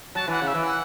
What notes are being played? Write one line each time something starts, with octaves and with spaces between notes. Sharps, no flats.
F#3 A5
E3 F#5
C#3
E5
E3
F#5